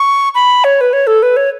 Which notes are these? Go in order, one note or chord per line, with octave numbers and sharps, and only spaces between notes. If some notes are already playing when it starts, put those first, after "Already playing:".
Already playing: C#6
B5
C#5
B4
C#5
A4
B4
C#5